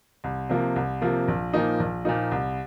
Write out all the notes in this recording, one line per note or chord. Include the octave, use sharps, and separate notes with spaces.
C2
C3 F3 A#3
C2
C3 F3 A#3
A#1
A#2 F3 A#3 D#4
A#1
A#2 F3 A#3 D#4
C2